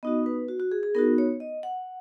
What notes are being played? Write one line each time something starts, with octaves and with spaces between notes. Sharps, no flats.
B3 D#4 F#4 D#5
B4
F#4
F#4
G#4
G#4
B3 D#4 F#4 A#4
C#5
D#5
F#5